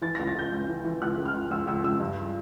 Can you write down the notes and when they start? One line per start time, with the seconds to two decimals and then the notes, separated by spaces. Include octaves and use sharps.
0.02 E3 A6
0.15 C#2 A#6
0.27 A6
0.35 C#2 G6
0.52 C#2
0.68 E3
0.84 E3
1.02 C#2 F#6
1.17 C#3
1.25 F6
1.34 C#2
1.50 C#2 E6
1.67 C#2 E6
1.84 C#2 E6
2.00 G2